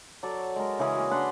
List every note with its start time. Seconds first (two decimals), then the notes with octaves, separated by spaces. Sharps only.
0.23 F#3 A4 D5
0.56 G#3 A#4
0.79 C#3 E3 C#4 G#4
0.95 A#3 F#4
1.11 D4 B4 F#5 C6